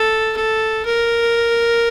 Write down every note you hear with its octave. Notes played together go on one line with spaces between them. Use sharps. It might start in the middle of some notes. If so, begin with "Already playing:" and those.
Already playing: A4
A4
A#4